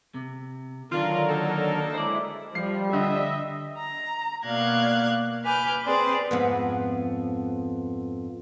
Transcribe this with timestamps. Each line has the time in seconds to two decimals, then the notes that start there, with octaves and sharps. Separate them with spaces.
0.14 C3
0.91 D3 D#3 F#3 D4 F4 A#4
1.29 A#3 D#4 A4
1.94 G#3 E4 C5 D5
2.55 F3 G3 C7
2.93 D3 D#5 E5
3.77 A#5
4.45 B2 A#3 D5 F5 F#6 G#6
5.45 B4 G#5 D6 F6 G6
5.86 C4 G#4 B4 C5 D5
6.31 F2 G#2 B3